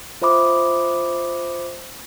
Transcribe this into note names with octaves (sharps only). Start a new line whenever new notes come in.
F4 C5 E5 B5 D6 D#6